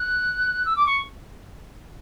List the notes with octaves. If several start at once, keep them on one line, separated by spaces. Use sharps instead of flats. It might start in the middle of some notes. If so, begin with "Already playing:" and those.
Already playing: F#6
E6
D6
C#6